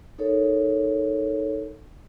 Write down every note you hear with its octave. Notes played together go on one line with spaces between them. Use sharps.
D#4 A4 A#4 C#5